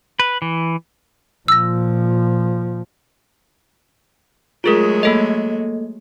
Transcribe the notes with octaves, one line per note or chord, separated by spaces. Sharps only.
B4
E3
A#2 F3 E6 A#6
F#3 G#3 A3 F4 G#4 A#4
A#3 A4 D#5